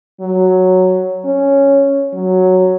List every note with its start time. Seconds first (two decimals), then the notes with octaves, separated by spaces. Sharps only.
0.21 F#3
1.25 C#4
2.14 F#3